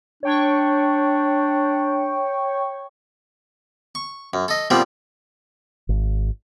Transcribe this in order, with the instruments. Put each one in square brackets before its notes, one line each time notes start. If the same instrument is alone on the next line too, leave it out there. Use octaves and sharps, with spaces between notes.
[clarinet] D4 [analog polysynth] C#5 G5 C#6
[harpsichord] C#6
F#2
A4 D#5
A#2 F3 G3 B3 C4
[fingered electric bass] G#1